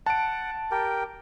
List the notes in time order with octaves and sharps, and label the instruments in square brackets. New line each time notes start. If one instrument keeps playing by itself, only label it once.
[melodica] F#5 [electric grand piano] A5 D7
[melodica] G4 A#4 G5